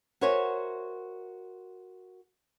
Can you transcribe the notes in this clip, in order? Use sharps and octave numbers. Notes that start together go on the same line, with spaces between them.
F#4 A#4 C5 C#5 E5 G#5